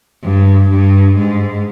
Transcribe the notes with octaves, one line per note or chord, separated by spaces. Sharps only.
G2
G2
G#2